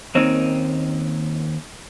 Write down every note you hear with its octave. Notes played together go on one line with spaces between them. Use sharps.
D#2 A#3 C4 C#4 D#4 A#4